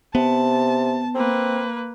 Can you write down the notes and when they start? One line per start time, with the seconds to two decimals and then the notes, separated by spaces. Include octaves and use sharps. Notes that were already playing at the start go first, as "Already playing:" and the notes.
0.15 C3 B3 A5
1.15 A#3 C4 B4